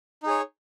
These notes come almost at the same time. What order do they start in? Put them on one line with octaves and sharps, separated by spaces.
D#4 G#4 C#5